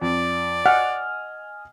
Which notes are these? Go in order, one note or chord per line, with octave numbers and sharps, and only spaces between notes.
F2 D5
D#5 F#5 G#5 F6